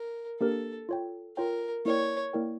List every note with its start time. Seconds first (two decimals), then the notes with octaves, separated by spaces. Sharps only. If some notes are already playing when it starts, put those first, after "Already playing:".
Already playing: A#4
0.40 A#3 D4 G4 A4 A#4
0.89 F4 C#5 G5
1.37 F4 A#4 C#5 G5
1.85 A#3 E4 A#4 C#5 D5 G5
2.33 A#3 E4 A#4 D5 G5